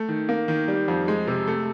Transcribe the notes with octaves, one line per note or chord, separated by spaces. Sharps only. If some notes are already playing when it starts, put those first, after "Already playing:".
Already playing: A3
D#3
A#3
D#3
G3
F2
G#3
C3
A3